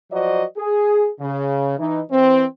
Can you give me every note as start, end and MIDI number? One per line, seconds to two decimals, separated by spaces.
0.11 0.43 53
0.11 0.43 54
0.11 0.43 66
0.11 0.43 72
0.11 0.43 74
0.11 0.43 75
0.57 1.08 68
1.20 1.75 49
1.78 2.01 52
1.78 2.01 63
2.10 2.44 52
2.10 2.44 60